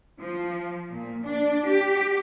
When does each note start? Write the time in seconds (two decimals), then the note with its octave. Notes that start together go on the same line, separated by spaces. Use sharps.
0.21 F3
0.91 A#2
1.23 D4
1.66 G4